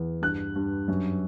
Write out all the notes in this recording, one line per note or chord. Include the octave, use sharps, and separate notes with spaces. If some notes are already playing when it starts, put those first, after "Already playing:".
Already playing: E2
G2 F#6
G2
F#2